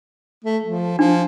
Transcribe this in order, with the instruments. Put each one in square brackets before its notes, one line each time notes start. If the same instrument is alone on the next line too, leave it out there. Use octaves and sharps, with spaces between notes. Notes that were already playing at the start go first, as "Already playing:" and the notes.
[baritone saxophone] A3
F3
[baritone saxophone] F3 [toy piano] D4